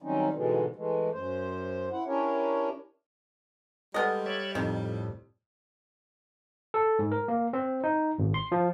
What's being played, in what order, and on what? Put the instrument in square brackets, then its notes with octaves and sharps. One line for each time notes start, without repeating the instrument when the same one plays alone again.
[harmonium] D#3 F#3 G3 C4 C#4 D#4
G#2 B2 D3 E3 G3 G#3
E3 G#3 A3
F#2 C5
E4 F#5
C#4 D4 E4 G4 A#4 C#5
[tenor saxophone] G3 [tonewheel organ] G#3 [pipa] B3 D#5 [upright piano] A4 F6
[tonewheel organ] C#5 D5 E5
[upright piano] F2 [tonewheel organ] A2 [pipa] D#3
[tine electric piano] A4
G#2
A#4
A#3
C4
D#4
G#1
C6
F3